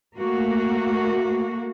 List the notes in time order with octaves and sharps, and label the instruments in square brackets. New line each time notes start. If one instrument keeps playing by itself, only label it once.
[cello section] A3 A#3 F#4